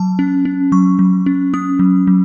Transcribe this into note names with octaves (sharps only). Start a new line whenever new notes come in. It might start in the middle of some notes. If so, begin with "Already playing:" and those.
Already playing: F#3 A5
C#4
C#4
F#3 C#6
F#3
C#4
C#4 D#6
F#3
F#3